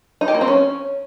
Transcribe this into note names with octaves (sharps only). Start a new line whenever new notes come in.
D#4
G4
A#3
C4
C#4